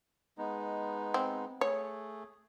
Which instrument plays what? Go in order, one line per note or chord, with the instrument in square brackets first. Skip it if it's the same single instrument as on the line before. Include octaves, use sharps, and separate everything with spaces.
[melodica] G#3 B3 D#4
[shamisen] C4
[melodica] A3 G#4 [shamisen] C#5